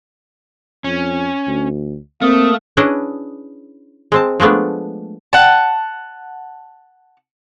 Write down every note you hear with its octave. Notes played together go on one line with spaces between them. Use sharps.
F2 C#4
D2
A3 A#3 C4 A#4 D#6
C#4 D4 E4 G#4 B4 D#5
G#3 C4 A5
F3 G#3 A3 B3 D4
F#5 A5